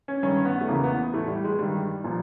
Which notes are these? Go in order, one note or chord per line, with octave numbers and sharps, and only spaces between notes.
C#4
G2 D#3 C#4
B3
A3
E2 C#3 E3 A#3
B3
A2 E3 A3
G3
G#3
G2 D#3 G3
A#2 F3